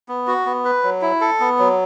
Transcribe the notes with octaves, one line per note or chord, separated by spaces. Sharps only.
B3
F#4
B3
B4
F#3
E4
A4
B3
F#3